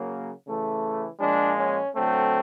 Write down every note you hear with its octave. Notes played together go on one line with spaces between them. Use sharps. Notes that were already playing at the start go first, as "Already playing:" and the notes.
Already playing: C#3 F#3 A#3
C#3 E3 A3
A#2 F3 G#3 D4
C#4
D3 F#3 A3 C4